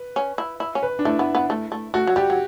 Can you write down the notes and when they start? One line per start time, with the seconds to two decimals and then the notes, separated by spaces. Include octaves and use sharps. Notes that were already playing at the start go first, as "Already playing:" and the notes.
Already playing: B4
0.16 C#4
0.38 E4
0.60 E4
0.75 C#4
0.83 B4
0.99 D4
1.05 A3 E4
1.19 B3
1.35 B3
1.50 A3
1.72 A3
1.94 A3 F#4
2.07 F#3
2.16 G3 G4
2.30 F#3